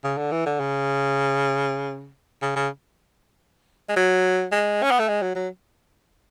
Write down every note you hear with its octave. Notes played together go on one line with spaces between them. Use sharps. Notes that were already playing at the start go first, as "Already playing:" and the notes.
C#3
D3
E3
D3
C#3
C#3
C#3
G#3
F#3
G#3
C#4
B3
A3
G#3
F#3
F#3